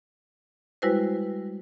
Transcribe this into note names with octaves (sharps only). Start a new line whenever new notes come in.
G3 G#3 E4 F#4 B4 C5